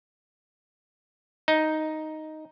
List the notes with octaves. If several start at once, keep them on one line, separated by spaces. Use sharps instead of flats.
D#4